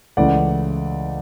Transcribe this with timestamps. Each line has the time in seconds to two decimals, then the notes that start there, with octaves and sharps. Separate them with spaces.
0.17 C#2 C#3 E3 A3 D5 F#5